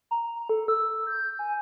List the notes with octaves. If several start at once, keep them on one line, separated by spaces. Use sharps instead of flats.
A#5
A4
E6
G6
G#5